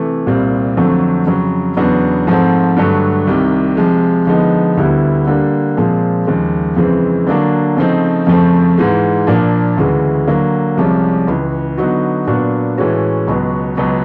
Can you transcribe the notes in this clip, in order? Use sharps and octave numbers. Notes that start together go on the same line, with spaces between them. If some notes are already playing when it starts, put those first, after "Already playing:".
Already playing: C3 E3 A3
C2 A#2 G3 C4
F2 D3 F#3 A3 C4
F2 C#3 F#3
E2 C#3 F#3 B3 D4
G#2 F3 A3 C4
G2 D3 F#3 A3
C2 C3 D#3
C3 F3 G#3
D3 F3 G#3 B3 D#4
D2 D3 G3 B3 E4
D3 G3 A#3 D4
A#2 F3 G#3 C4
D#2 C#3 F3 G#3
F2 C#3 E3 G#3 C4
D3 F#3 A#3 D4
C#3 F3 A3 C4 D#4
F2 C#3 F3 A3 C4
G#2 E3 G#3
A#2 F3 A#3 D4
D2 C#3 E3 G#3
D3 F#3 A#3
C2 C3 F3 G#3 C#4
C#2 C#3 E3
D3 F#3 B3 D#4 F#4
A#2 F#3 B3 D4 F#4
A2 E3 G#3 C#4 F#4
C#2 B2 F#3
C#2 B2 F#3